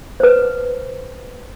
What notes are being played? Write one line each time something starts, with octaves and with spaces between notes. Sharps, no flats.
B4 C5